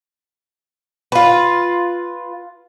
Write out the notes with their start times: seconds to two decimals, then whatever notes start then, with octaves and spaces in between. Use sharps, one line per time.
1.12 F4 B4